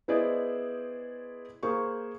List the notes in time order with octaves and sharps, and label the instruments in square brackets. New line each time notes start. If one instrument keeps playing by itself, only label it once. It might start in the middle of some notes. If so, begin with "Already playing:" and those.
[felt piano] B3 E4 G#4 C5 D5 D#5
A#3 G#4 C5 C#6